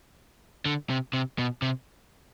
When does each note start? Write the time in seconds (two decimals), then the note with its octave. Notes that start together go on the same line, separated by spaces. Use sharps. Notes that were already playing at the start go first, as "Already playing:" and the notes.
0.66 D3
0.90 C3
1.13 C3
1.38 B2
1.62 C3